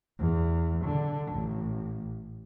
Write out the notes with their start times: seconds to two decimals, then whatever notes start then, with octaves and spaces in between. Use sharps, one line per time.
0.19 E2
0.84 D3
1.32 A1